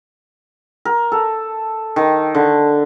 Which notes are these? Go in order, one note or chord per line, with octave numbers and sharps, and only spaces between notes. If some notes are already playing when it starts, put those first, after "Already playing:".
A#4
A4
D#3
D3